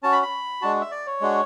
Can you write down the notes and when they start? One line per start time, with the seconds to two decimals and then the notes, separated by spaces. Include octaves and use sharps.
0.03 C#4 F#4 A5
0.12 B5
0.22 B5
0.61 G#3 D4 F#4 A5
0.81 E5
0.91 D5
1.06 C#5
1.21 G#3 D4 F#4